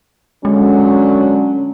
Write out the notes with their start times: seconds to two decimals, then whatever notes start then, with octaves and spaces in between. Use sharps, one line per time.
0.45 D3 F#3 G#3 C#4